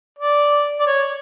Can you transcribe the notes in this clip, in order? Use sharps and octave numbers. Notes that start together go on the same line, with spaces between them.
D5
D5
C#5